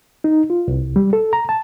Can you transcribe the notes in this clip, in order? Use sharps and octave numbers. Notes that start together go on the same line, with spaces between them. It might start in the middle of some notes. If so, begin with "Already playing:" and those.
D#4
F4
C2
G3
A4
A#5
A5